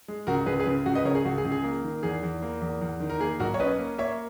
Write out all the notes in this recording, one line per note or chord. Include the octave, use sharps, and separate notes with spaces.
G#3
C#2 F#4 A#4
C#2 G#4 B4
G#4 B4
C#3
C#2 F#4
B4 D#5
C#3 A#4 C#5
G#4
C#2 F#4
G#4
C#2
G#4
A#3
D#3
E2 G#4
E2
A#3
E2
E2
D#3
A#4
A#3 G#4
B1 F#4 A#4
C#5
C#4 B4 D#5
A#3
A#3 C#5 E5